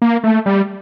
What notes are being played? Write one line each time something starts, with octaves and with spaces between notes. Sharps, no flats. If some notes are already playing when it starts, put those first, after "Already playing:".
A#3
A3
G3